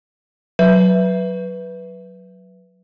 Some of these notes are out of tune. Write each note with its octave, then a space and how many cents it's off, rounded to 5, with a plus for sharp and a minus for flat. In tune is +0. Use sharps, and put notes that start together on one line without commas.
F#3 +0 B4 +0 E5 +0